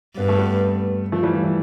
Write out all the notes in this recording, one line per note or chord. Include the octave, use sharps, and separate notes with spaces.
G2 B3
A3
G3 B3
F3 A3
E3 G3
F3
E3